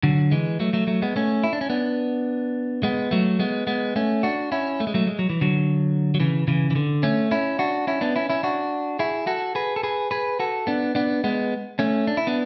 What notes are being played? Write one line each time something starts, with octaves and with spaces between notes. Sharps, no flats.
D3 F#3
E3 G#3
F#3 A3
F#3 A3
F#3 A3
G#3 B3
A3 C#4
E4
D4
C#4
B3 D4
G#3 B3
F#3 A3
G#3 B3
G#3 B3
A3 C#4
D4 F#4
C#4 E4
A3
G#3
F#3 A3
G#3
F#3
E3
D3 F#3
F#3
C#3 E3
C#3 E3
E3
D3
A3 C#4
C#4 E4
D4 F#4
C#4 E4
B3 D4
C#4 E4
C#4 E4
D4 F#4
E4 G#4
F#4 A4
G#4 B4
A4
G#4 B4
G#4 B4
F#4 A4
B3 D4
B3 D4
G#3 B3
A3 C#4
D4
E4
B3 D4